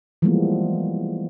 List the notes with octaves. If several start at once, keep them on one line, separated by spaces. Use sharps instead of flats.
E3 F3 G3 G#3 A#3 B3